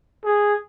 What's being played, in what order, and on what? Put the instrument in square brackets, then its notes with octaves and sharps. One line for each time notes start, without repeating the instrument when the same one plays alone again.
[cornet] G#4